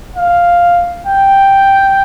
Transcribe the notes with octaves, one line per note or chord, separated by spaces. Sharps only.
F5
G5